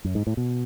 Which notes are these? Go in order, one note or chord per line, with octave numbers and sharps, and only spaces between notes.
F#2
G#2
A2
B2